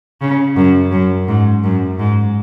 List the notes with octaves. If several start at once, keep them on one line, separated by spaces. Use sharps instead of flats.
C#3
F#2
F#2
G#2
F#2
G#2